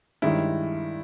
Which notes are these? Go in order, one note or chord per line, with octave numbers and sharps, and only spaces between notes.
G2 D#3 G#3 C#4 E4